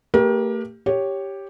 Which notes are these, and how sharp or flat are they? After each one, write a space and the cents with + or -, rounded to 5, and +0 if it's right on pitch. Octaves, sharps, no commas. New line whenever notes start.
A3 +45 G4 +5 A#4 +35
G4 +0 C#5 +0